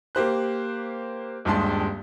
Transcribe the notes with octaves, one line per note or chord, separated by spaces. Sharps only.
A#3 G4 C5 F#6
D#1 G2 G#3 A5 C6